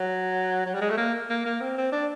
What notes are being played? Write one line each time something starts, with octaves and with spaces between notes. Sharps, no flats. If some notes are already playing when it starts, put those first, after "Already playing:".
Already playing: F#3
F#3
G3
G#3
A3
A#3
A#3
A#3
C4
C4
D4